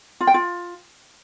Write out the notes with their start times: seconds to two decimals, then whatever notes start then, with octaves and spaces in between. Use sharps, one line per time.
0.21 F4
0.27 G5
0.34 F4